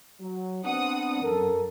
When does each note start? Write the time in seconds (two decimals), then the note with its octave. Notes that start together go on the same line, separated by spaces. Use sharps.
0.21 F#3
0.65 B3 C4 D4 F#5 D#6
1.23 F#2 A4 A#4